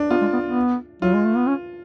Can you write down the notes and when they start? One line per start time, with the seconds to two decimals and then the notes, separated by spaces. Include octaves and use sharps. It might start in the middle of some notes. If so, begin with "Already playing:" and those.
Already playing: D4
0.10 B3 F4
0.21 G#3
0.33 B3
0.45 B3
1.02 F#3 F4
1.14 G#3
1.25 A3
1.36 B3
1.47 C#4